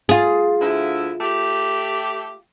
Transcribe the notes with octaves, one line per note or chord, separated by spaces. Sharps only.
F4 G#4
D2 E4
A3 G4